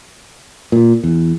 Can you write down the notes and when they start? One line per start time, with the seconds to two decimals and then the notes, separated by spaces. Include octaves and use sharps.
0.72 A#2
1.04 E2